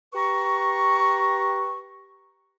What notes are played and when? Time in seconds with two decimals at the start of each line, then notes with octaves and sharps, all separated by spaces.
0.14 G4 B4 A#5 C#6